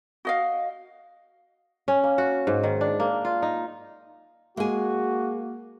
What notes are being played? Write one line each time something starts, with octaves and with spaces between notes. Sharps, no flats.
F#4 D#5 F5
C#4
A#3
F#4
G#2
D#3
D4
A#3
F4
D#4
G#3 A#3 F#4 G#4